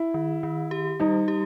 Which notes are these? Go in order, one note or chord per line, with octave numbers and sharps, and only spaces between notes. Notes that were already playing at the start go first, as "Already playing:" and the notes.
Already playing: E4
D#3
D#3
G4
G3 D#4
G4